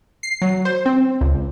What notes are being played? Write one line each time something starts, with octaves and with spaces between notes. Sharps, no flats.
C7
F#3
C5
C4
C#2